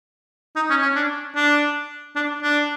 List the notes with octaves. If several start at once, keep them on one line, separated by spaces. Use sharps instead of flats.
D#4
C#4
C#4
D4
D4
D4
D4